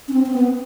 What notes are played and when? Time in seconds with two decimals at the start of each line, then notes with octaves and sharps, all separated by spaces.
0.08 C#4
0.13 C4
0.26 C4
0.34 B3